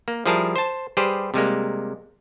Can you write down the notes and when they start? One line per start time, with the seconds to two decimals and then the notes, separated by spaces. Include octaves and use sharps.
0.08 A#3
0.26 F3 G3 E4 G#4 A#4 A5
0.56 C5 A5
0.97 G3 G4 G#4 B4 C5
1.34 C3 G3 G#3 A#3